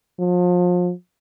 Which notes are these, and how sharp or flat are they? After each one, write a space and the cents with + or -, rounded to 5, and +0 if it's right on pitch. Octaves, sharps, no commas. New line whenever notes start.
F3 +35